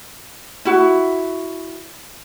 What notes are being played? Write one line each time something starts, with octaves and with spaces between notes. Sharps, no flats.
E4 F#4